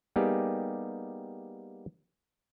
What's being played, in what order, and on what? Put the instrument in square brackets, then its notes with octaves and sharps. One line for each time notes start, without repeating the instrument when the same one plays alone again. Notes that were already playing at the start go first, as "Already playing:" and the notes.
[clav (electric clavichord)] G3 A#3 B3 D#4 G4 G#4